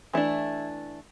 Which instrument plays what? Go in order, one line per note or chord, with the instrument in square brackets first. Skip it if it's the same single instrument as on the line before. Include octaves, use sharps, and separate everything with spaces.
[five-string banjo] E3 A3 D4 E4